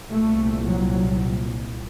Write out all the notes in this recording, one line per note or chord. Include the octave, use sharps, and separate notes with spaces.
C2 A#2 A3
F#3